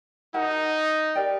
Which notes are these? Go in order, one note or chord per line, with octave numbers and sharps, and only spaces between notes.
D#4 F#4 A#4 F#5 A5
G4 A#4 D5 G5